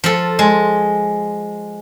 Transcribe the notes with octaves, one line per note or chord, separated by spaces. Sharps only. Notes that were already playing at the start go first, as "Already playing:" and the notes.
F3 A4
G#3